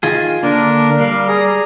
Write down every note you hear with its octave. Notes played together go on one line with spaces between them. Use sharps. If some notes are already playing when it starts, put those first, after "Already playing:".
D#3 F4 G#4 G#5
D3 A#3 D4 A#4
G3 A#4 F5
G#4 A#5